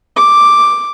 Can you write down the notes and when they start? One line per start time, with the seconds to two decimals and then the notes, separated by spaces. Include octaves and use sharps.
0.17 D6